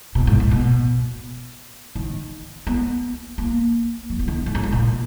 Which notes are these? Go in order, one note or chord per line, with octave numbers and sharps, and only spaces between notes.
B2
G#2
A#2
B2
D#3
B3
A#3
F#3
B3
D#3
G#2
F#2
G#2
A#2